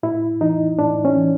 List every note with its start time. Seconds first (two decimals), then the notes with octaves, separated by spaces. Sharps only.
0.03 A2 E4
0.41 E3 D#4
0.79 A2 D4
1.05 C#4
1.17 E3